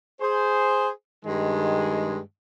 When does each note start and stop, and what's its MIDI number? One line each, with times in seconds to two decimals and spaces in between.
0.21 0.89 68
0.21 0.89 72
1.25 2.17 43
1.25 2.17 51
1.25 2.17 56